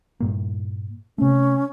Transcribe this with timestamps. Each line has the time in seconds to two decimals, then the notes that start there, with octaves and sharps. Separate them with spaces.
0.20 G2 A#2 A#3
1.18 C3 A3 C#4